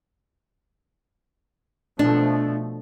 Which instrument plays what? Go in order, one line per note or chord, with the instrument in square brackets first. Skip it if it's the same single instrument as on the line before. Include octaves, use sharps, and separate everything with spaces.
[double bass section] B2 F3 A3 [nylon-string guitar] D4